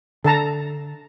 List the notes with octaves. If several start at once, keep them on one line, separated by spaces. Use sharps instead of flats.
D3 A4 A5 A#5